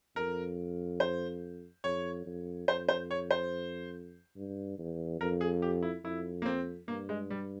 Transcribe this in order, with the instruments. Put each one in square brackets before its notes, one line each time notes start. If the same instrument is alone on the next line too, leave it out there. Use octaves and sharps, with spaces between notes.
[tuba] F2 [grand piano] A#4
[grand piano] C5
[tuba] F2 [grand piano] C#5
[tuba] F2
[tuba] F2 [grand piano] C5
[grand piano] C5
C#5
C5
[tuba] G2
E2
[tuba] F2 [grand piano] A#4
[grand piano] G#4
G4
E4
[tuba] F2 [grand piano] E4
[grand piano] A#3
C4
[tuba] G2 [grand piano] A#3
[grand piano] G#3
G3